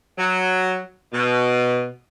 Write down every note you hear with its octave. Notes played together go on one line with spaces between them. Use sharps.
F#3
B2